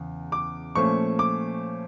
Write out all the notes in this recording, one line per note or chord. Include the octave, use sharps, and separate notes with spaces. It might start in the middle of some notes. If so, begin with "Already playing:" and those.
Already playing: E2 C#3
D6
A#2 F3 A3 C#4 C#6
D6